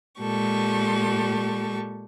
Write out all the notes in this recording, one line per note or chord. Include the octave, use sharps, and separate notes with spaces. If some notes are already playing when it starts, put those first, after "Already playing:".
A#2 G#3 G4 A4 C#6